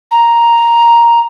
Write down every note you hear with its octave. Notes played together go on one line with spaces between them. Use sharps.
A#5